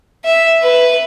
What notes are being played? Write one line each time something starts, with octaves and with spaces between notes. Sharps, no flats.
E5
B4